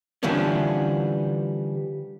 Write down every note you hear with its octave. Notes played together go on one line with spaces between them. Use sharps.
D3 E3 F3 G3 C#4